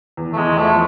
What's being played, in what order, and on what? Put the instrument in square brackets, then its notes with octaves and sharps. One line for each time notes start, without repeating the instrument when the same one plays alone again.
[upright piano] E2
[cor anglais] A3
[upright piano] E2 [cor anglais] G#3
[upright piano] F3 [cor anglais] A3